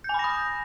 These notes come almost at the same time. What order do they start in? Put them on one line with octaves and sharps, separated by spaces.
G6 G#5 B5 A#6 D#6